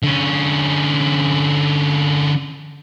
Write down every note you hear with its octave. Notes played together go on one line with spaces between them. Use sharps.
D3 C#4